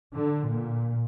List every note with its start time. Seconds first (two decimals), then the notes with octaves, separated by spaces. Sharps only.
0.14 D3
0.51 A#2